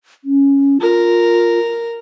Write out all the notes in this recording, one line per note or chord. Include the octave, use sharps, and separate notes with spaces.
C#4
F4 A#4